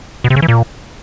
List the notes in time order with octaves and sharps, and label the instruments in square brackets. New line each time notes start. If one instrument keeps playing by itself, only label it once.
[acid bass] B2
C3
C#3
E3
A#2